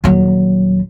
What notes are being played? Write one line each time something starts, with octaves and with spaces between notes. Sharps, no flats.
D#1 F#3